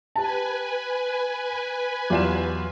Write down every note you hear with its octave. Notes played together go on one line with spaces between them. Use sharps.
G4 B4 G#5 A5
E2 F#3 F4 G4 D5 E7